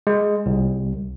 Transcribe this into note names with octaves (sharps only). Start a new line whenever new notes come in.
G#3
C2